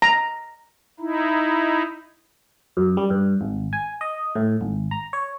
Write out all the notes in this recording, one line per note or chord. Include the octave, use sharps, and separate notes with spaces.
A#5
D#4 E4
F#2
G3
G2
G#1
G#5
D#5
A2
G#1
A#5
C#5